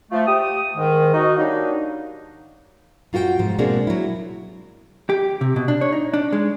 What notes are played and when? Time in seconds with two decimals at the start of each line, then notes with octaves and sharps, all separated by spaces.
0.11 F3 A3
0.27 G4 D#6
0.76 G#2 D#3
1.13 D#4 F#4
1.37 F#3 G3 A#3 D4 D#4
3.13 F#2 F4 F#4 G#4 G5
3.39 G#2 B2 F3
3.59 B2 G#3 A#3 C4 D4 G#4
3.87 F#3 E4
5.10 G4
5.41 C3
5.56 B2
5.68 D4
5.81 C#5
5.92 D#4
6.13 D4
6.32 G#3